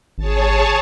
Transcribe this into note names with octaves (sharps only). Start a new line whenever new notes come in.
G#1 G#4 C#5 A5